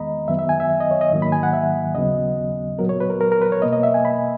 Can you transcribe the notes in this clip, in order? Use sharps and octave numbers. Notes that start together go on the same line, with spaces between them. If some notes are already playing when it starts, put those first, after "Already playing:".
Already playing: E2 D#3 G#3 B3 D#5 A#5 B5
F#2 D#3 F#3 B3 E5
E5
G#5
E5
D#5
C#5
D#5
G#2 D#3 F#3 A#3
B5
G#5
F#5
E5
D#2 C#3 F#3 B3 D#5
A#2 F#3 B3 A#4
C#5
B4
A#4
A#4
A#4
B4
C#5
B2 A#3 D#5
D#5
E5
G#5
B5